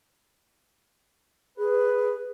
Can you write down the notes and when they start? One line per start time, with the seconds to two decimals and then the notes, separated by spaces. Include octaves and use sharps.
1.58 G#4 B4